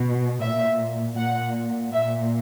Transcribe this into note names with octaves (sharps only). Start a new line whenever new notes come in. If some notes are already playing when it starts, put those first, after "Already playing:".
Already playing: B2
A#2 E5
A#2 F#5
A#2 E5